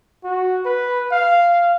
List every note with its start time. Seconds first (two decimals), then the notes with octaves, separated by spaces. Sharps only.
0.24 F#4
0.65 B4
1.12 F5